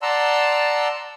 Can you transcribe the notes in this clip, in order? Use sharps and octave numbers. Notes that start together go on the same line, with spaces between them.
D5 F#5 A5 A#5 C6 E6